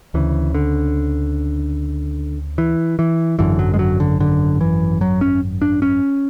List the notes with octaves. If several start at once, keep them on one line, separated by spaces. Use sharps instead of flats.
D2 C#3 E3
D3
E3
E3
G#1 F#2 D3 E3
F#3
G#3
F#3
D3
D3
E3
F#3
C#4
D4
C#4